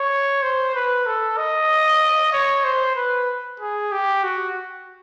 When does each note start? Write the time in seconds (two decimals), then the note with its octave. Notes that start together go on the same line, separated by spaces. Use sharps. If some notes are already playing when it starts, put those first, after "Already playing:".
Already playing: C#5
0.42 C5
0.75 B4
1.06 A4
1.37 D#5
2.32 C#5
2.64 C5
2.96 B4
3.60 G#4
3.92 G4
4.24 F#4